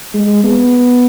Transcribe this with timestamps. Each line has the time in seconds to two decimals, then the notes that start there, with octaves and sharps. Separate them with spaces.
0.14 G#3
0.44 B3